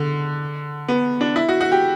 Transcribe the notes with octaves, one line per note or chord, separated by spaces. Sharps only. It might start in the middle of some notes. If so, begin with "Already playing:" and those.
Already playing: D3
B3
D4
E4
F#4
F#4
G4